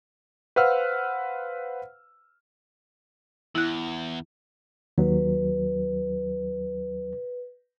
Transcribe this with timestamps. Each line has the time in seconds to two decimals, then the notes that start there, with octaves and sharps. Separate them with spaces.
0.56 B4 C5 F5 F#5 E6 F6
3.55 E2 E4 F#6
4.98 D#2 F#3 B4